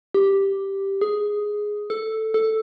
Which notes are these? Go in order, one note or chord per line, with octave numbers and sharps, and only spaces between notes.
G4
G#4
A4
A4